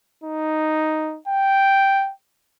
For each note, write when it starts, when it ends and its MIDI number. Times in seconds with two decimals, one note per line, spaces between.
0.24 1.18 63
1.27 2.12 79